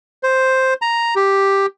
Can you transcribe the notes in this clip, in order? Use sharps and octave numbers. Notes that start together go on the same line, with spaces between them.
C5
A#5
G4